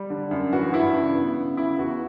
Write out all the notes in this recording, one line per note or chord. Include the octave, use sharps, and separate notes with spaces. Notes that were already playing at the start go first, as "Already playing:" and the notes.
Already playing: G3
D3
F#2
E3 F#4
G2 E4
C#3
B3
C#3
C#3 E4
E2 F#4